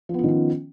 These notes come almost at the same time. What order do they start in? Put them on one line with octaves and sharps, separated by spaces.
F3 B3 F4 D#3 C#4